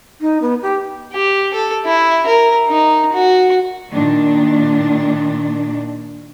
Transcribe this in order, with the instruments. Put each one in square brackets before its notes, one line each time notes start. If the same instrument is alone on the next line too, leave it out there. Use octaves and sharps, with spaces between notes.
[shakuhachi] D#4
B3
G4
[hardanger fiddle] G4
A4
E4
A#4
D#4
F#4
[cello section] A#2 D#3 D4